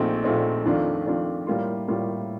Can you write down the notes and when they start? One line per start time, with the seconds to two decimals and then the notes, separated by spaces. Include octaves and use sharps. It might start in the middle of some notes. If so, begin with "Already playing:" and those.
Already playing: A#1 A#2 A3 C4 D#4
0.24 A#1 A#2 A3 C4 D#4
0.66 F2 D#3 A3 D4 F4
1.06 F2 D#3 A3 D4 F4
1.47 A2 G3 A#3 F4
1.88 A2 G3 A#3 F4